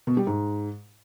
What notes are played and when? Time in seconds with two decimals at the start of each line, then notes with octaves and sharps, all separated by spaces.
0.07 B2
0.17 G3
0.27 G#2